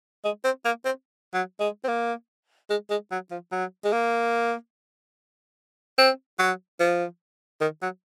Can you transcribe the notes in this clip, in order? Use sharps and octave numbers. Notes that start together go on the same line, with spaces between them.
G#3
C4
A#3
C4
F#3
G#3
C4
A#3
G#3
G#3
F#3
F3
F#3
G#3
A#3
C4
F#3
F3
D#3
F#3